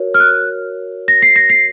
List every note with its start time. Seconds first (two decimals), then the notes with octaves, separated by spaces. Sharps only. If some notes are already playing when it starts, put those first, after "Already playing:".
Already playing: F#4 A#4 C#5
0.14 F6
0.20 F#6
1.08 A#6
1.22 C7
1.36 A#6
1.50 C7